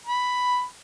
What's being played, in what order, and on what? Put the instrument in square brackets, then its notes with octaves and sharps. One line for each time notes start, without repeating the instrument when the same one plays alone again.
[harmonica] B5